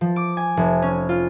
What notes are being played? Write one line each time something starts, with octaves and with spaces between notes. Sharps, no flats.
F3
D6
G#5
F1
C#4
F4